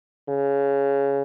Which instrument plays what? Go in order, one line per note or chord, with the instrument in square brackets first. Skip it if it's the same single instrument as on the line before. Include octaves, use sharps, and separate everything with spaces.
[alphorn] C#3